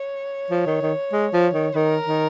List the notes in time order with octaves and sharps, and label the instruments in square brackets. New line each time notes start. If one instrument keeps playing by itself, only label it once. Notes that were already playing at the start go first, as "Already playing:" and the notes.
Already playing: [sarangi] C#5
[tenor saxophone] F3
D#3
D#3
G#3
F3
D#3
[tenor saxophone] D#3 [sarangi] A#4
[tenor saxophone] D#3